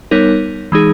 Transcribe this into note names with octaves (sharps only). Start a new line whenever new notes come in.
G3 B3 D#4 A#4 C#5
E3 G#3 D#4 G#4